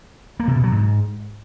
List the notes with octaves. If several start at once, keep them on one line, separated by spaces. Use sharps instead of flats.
A#3
C3
B2
F#3
G#2